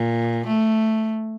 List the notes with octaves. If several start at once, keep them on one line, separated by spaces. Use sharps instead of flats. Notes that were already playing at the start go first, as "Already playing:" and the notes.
Already playing: A#2
A3